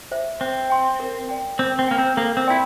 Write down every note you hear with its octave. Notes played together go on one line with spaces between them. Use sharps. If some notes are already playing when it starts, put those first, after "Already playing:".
C5 E5
C4 C5
G5 C6
A#4
D5 G5
C4 C5
C4
A#3 G5 A#5
C4
A#3 A4
C4
E4 D5 G5 C6